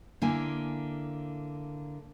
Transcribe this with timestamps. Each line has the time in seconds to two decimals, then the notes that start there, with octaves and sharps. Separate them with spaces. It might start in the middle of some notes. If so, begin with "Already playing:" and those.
0.22 D3 A#3 E4 G#5